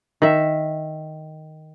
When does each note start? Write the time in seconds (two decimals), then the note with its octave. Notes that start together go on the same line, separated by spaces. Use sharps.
0.22 D#3 E5